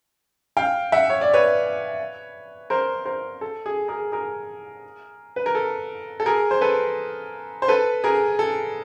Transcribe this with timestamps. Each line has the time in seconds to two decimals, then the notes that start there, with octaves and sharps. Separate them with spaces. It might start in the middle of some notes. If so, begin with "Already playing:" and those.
0.57 F5 G5
0.92 E5 F#5
1.10 C#5
1.21 D5
1.34 B4 C#5
2.70 A#4 C5
3.05 A#4 C5
3.41 A4
3.66 G#4
3.88 G#4 A#4
4.12 G#4 A#4
5.36 B4
5.46 A#4
5.55 A4
6.20 A4
6.26 G#4 A#4
6.51 C5
6.61 A4 B4
7.62 C5
7.68 A4 B4
8.04 G#4 A#4
8.39 A4